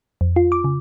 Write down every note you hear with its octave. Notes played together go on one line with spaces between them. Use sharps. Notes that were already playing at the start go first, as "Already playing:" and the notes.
F2
F4
D6
C#3